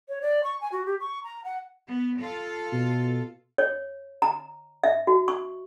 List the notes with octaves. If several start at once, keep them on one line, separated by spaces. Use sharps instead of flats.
C#5
D5
C#6
G#5
F#4
G4
C#6
A#5
F#5
B3
F4 A4 F5
B2
C#5
A#5
E5
F#4
C#6